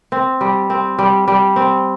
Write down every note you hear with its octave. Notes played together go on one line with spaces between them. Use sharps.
C4
G3
C4
G3
G3
C4